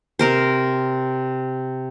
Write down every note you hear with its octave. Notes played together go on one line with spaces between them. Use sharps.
C3 A#4 C5